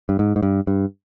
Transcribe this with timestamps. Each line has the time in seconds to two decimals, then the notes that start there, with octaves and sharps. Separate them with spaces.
0.09 G2
0.19 G#2
0.36 G#2
0.43 G2
0.67 G2